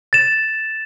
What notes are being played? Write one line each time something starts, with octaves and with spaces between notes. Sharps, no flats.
A6 E7